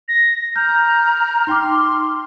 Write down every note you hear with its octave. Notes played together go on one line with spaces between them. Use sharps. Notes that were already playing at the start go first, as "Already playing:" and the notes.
A#6
A#5 F6 G6
D#4 G5 C6 D6